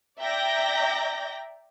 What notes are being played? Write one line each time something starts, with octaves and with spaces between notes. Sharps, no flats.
D5 E5 G5 A#5 G6 A#6